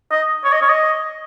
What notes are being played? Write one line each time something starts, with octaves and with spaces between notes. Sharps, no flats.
D#5
C#5
D#5
C#5
D#5